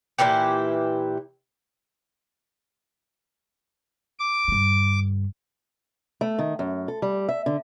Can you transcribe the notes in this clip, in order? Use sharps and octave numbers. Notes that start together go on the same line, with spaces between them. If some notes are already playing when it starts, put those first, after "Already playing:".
A#2 E3 E4 G4
D6
G2 D3
A3
D#3
F#2
A4
G3
E5
D3